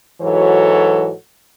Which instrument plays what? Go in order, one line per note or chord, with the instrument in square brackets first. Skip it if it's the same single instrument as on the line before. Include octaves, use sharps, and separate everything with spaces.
[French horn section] G#2 E3 F#3 F#4 A4 C#5